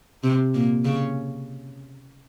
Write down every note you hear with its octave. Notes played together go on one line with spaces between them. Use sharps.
C3 C4
A#2 A#3
C#3 C#4